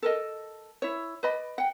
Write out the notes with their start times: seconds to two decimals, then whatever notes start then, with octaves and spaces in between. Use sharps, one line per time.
0.02 A4 A#4 D#5
0.82 E4 C#5
1.23 B4 D5 D#5 B5
1.58 F#5 G5